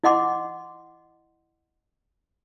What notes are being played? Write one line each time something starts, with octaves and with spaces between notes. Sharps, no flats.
E4 D#5 F#5 C6 D6